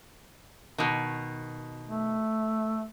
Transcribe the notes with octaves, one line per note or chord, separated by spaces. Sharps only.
B2 D#3
A3